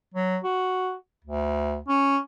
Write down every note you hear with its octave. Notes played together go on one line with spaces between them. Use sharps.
F#3
F#4
D2
C#4